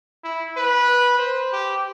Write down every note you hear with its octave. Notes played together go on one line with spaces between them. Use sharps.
E4
B4
C5
G4